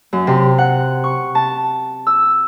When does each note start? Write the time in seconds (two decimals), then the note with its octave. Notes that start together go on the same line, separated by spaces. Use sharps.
0.13 F#2
0.27 C3
0.58 F#5
1.04 C#6
1.35 A5
2.07 E6